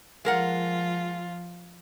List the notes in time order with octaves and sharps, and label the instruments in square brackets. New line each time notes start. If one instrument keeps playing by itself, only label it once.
[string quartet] F3 F4 [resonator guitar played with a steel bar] G#3 A#4 F#5